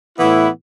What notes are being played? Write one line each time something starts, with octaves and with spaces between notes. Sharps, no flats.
A2 E3 B3 E4